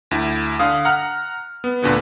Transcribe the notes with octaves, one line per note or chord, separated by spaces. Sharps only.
D2 E4
D3 F5 D#6
F#5 A#5 F6
B3
D2 A#2 D3 B3